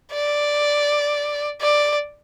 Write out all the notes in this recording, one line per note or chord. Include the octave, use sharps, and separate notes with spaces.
D5
D5